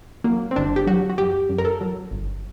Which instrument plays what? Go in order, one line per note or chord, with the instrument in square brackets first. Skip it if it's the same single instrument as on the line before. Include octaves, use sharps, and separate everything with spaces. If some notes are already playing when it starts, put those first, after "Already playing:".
[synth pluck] F#3 A#3
C4
G1 D4
G4
F#3 F#4
F#4
F#2 G4
F#2
A#4
A4
F#3
G1